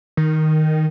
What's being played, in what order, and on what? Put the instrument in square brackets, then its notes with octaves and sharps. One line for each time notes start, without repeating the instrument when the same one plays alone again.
[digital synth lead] D#3